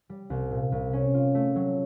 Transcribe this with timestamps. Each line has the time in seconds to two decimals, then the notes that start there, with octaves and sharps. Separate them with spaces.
0.09 G3
0.30 C2
0.51 A#2
0.72 C2
0.93 C#4
1.14 F4
1.35 A3
1.56 F#3